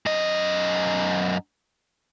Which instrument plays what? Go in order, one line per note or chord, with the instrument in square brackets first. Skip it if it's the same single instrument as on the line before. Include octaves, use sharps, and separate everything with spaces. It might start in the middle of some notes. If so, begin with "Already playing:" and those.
[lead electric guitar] F#2 D#5